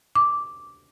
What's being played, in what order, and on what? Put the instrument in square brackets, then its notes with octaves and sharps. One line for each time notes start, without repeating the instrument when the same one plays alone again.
[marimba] D6